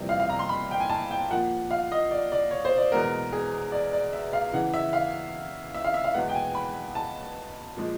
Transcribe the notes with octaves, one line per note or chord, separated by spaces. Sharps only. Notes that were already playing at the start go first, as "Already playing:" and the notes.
Already playing: F2 C3 E3 G3 A#3
F5
F5
A#5
C6
B5
G5
G#5
A5
G5
A#2 F3 A#3 F#5
F5
D#5
D5
D5
C#5
C5
D5
E2 B2 G#3 B3 A#4
G#4
D5
D5
E5
F5
E2 C#3 E3 F#5
E5
F5
E5
F5
E5
F5
E2 B2 G#3 B3 F#5
G5
G#5
B5
A5
A#2 F3 G#3